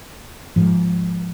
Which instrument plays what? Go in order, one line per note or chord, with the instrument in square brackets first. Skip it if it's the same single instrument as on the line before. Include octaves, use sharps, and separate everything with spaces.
[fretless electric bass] G#2 F3